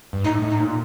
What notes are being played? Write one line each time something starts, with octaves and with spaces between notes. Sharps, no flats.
G2
A2 D#4
A2
D#4
A#2